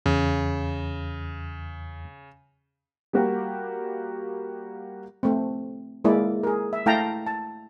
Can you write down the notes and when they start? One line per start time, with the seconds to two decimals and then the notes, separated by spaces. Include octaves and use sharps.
0.06 E2 C#3
3.13 G3 A#3 F#4 G4 A#4
5.23 A3 C4
6.04 G#3 A#3 E4 D5
6.43 G#4 A#4
6.73 E5
6.86 A3 E4 F5 G5 A5 A#5
7.27 A5